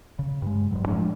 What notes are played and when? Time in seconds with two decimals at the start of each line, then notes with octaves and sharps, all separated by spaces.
0.19 C#3
0.42 G2 G#3
0.71 D#1 B1 G2 F#3
0.87 A2 F3 G#3 D4